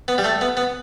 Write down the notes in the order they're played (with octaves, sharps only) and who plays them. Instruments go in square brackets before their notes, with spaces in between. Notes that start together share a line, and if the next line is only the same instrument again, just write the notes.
[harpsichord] B3
G3
A3
B3
B3